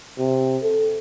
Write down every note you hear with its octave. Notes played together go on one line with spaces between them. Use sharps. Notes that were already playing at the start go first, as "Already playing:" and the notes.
C3
A4